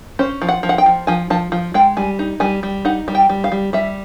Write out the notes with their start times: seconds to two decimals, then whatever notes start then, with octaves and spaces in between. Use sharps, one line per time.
0.19 C#4 C5
0.42 F3
0.49 F#5
0.63 F3
0.69 F#5
0.78 G5
0.86 F3
1.07 F3 G#5
1.30 F3 A5
1.52 F3
1.74 G#3 G5
1.97 G3 G#5
2.19 D#4
2.40 G3 G#5
2.63 G3
2.85 D#4 F#5
3.08 G3
3.15 G5
3.29 G3
3.44 F5
3.52 G3
3.73 G3 E5